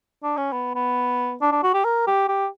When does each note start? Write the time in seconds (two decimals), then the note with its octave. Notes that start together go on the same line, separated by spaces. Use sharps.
0.23 D4
0.37 C#4
0.52 B3
0.75 B3
1.41 D4
1.52 D4
1.63 F#4
1.74 G4
1.85 A#4
2.07 G4
2.28 G4